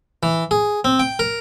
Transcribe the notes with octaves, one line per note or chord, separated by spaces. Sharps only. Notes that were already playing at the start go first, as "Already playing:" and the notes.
E3
G#4
C4
G5
A#4